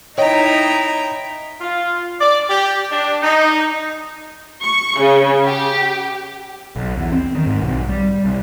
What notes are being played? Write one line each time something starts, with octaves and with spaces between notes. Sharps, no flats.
D#4 E4 C#5 D#5 G5 A#5
F4
D5
G4
D4
D#4
C#6
C#3
G4
B1
E2
C4
D#3
G#2
B1
G3
C2